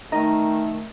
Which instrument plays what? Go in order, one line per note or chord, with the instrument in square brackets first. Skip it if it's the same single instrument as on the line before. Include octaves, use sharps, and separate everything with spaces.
[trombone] D#3 [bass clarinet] A3 [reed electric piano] D#4 A#5 [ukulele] D#5